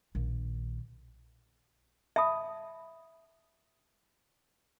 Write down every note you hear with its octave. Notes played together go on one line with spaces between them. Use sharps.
A#1 D#3
E5 A5 B5 D#6